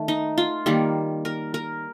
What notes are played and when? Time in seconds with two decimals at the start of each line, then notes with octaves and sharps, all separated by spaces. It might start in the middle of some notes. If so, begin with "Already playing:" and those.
Already playing: D#3 A3
0.08 D#4
0.38 F4
0.66 D#3 G3 A#3
1.25 A#4
1.54 A#4